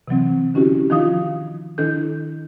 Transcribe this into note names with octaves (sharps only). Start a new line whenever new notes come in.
C3 E3 F#3 C4
D3 C#4 E4 F#4 G4
D#3 F3 D#4 F4 F5 D#6
D#3 D4 E4 A4 G6